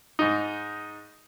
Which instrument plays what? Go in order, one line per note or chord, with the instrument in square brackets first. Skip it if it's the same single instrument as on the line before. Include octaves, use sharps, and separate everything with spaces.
[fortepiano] G#2 D#4